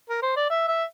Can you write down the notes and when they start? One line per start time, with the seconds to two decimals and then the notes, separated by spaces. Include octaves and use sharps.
0.09 A#4
0.23 C5
0.36 D5
0.50 E5
0.68 E5